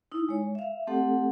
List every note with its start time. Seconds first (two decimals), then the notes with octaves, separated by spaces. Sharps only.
0.12 D#4 E4
0.29 G#3 C#5
0.55 E5 F5
0.87 A3 C4 G4 A4 F#5